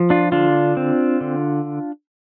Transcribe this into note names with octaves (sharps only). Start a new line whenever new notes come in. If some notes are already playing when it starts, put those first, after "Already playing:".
Already playing: F3
D4 F4
D3 D4 F4
C4
D3